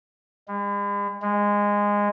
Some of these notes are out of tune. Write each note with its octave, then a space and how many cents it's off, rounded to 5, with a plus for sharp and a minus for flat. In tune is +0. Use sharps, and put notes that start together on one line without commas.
G#3 -45
G#3 -15